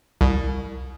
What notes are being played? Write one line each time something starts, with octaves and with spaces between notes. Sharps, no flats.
C2